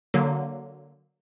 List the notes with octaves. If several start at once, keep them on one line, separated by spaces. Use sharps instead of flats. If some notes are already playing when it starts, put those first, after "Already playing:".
D3 F#3 A#3